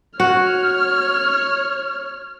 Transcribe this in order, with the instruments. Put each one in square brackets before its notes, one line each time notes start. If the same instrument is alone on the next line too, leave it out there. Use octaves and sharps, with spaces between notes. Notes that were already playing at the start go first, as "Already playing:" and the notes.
[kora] F#4 [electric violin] C#5 F6